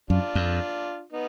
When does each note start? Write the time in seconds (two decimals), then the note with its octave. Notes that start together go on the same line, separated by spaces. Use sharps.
0.10 F#2 D4 F4
0.35 F2
1.12 B3 D#4